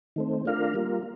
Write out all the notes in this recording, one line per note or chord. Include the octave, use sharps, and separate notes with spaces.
D#3 A3 C4
A3 D4 F4 A#4 F5
G3 A#3 F4